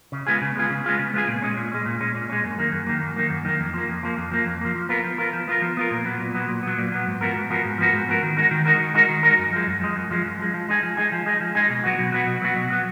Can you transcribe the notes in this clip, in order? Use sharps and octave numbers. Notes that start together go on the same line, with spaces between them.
C#3
G#3 B3 F4 G#4
C#3
G#3 B3 F4 G#4
C#3
G#3 B3 F4 G#4
C#3
G#3 B3 F4 G#4
A#2
G#3 C#4
A#2
G#3 C#4
A#2
G#3 C#4
A#2
G#3 C#4
F#2
D#3 A#3
F#2
D#3 A#3
F#2
D#3 A#3
F#2
D#3 A#3
F2
F3 A#3
F2
F3 A#3
F2
F3 A#3
F2
F3 A#3
F3
B3 F4 A#4
F3
B3 F4 A#4
F3
B3 F4 A#4
F3
B3 F4 A#4
A#2
F#3 B3
A#2
F#3 B3
A#2
F#3 B3
A#2
F#3 B3
G#2
F3 B3 F#4 A#4
G#2
F3 B3 F#4 A#4
G#2
F3 B3 F#4 A#4
G#2
F3 B3 F#4 A#4
D#3
G#3 D#4 F#4 A#4
D#3
G#3 D#4 F#4 A#4
D#3
G#3 D#4 F#4 A#4
D#3
G#3 D#4 F#4 A#4
F#2
F3 G#3
F#2
F3 G#3
F#2
F3 G#3
F#2
F3 G#3
F3
G#3 D#4 G#4
F3
G#3 D#4 G#4
F3
G#3 D#4 G#4
F3
G#3 D#4 G#4
B2
F#3 B3 F#4
B2
F#3 B3 F#4
B2
F#3 B3 F#4
B2
F#3 B3 F#4